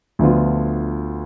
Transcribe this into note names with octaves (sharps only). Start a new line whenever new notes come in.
D2 D3 F3 B3 F4